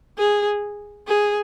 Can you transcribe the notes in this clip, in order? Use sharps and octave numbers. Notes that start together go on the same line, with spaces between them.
G#4
G#4